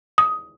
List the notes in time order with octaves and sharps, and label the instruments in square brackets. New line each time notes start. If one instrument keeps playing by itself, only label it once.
[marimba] D#6